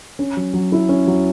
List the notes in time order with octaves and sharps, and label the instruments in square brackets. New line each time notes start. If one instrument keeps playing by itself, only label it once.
[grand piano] C#4
F#3
F#3
E4
C#4
F#3